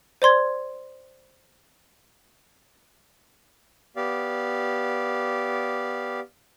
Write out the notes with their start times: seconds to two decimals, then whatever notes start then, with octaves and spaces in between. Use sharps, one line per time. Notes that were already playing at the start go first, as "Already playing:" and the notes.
0.22 C5 D5 C6 G#6
3.96 B3 G4 D5 F5